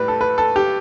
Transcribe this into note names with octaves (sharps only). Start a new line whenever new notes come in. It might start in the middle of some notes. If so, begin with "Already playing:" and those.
Already playing: A2 G3 B4
A4
B4
A4
G4